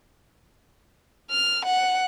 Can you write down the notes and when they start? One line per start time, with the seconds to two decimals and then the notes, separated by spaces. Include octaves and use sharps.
1.31 F6
1.65 F#5